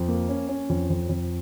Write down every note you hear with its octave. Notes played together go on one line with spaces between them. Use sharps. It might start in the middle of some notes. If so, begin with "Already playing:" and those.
Already playing: F2
A#3
C#4
C#4
F2
F2
F2